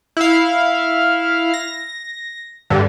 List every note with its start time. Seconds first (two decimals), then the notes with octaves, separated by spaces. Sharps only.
0.17 E4 F5
1.54 A#6
2.70 G2 D3